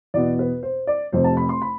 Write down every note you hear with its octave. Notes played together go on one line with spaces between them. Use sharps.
E2 B2 B3 D5
B4
C5
D5
F1 F2 C3 C5
A5
B5
C6
B5